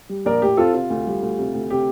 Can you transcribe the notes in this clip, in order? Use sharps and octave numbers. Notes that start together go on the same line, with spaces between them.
G3
A#1 A#4 D5
A2 G4
C4 F4 A4
C3 F4
D2
G3
D2
C3
D2
C3 G4